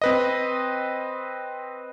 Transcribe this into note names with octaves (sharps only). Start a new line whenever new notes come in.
C4 B4 D#5